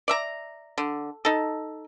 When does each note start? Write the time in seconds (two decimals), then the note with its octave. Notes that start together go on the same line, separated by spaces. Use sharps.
0.08 D5 E5 A#5
0.78 D3
1.25 D#4 A4